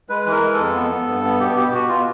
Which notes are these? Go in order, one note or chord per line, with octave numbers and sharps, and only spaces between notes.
G#3 B4
E3
A#4
G#3
A4
F2
B3
B3
G2
B3
B2 G4
B2 G4
B2 F#4
B2 F4